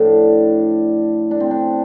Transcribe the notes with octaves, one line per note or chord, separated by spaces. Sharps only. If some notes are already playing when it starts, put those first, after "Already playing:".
Already playing: A2 F3 D4
D4
C4
D4